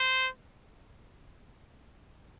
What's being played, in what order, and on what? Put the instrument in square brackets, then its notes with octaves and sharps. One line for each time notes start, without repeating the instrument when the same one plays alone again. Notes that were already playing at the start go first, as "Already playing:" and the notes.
Already playing: [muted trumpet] C5